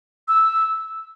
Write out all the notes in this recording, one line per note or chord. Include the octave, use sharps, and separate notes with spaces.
E6